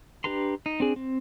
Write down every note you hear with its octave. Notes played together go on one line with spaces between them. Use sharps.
D4 G4 B4 A#5 C6
D#4
C4 D4 G#4
C4